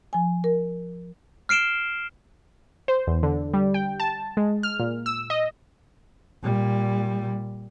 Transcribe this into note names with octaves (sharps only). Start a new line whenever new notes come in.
F3 G#5
A#4
F6 C7 D7 E7 G7
C5
E2
D3
G3
G5
A5
G#3
F6
A#2
E6
D#5
A#2 G3